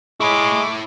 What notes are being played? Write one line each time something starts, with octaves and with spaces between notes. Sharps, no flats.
G#3 E4 C#5 B5 C#6 D6